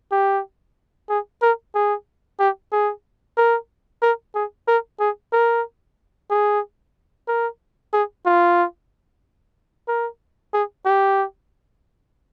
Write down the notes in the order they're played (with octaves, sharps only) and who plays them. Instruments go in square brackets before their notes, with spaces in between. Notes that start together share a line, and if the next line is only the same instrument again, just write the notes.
[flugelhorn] G4
G#4
A#4
G#4
G4
G#4
A#4
A#4
G#4
A#4
G#4
A#4
G#4
A#4
G#4
F4
A#4
G#4
G4